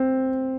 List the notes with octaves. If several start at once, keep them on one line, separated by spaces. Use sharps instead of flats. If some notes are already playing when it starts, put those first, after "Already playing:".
Already playing: C4